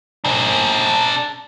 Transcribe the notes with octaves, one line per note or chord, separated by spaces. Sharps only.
D4 G#4